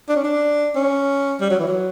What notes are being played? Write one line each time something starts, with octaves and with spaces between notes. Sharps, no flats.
D4
C#4
D4
C#4
G3
F#3
E3
F#3